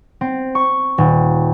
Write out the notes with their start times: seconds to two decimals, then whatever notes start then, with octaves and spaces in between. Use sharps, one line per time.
0.21 C4
0.55 C#6
0.98 D#1